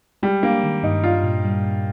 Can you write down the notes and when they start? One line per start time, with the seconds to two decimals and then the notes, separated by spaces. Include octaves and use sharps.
0.23 G3 G#3
0.43 A#3 D4
0.63 D#3
0.83 G2 D#4
1.04 D4 F4
1.24 A#2
1.45 G3
1.64 A#2